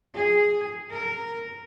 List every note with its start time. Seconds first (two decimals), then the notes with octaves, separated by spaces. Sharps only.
0.15 G#4
0.89 A#4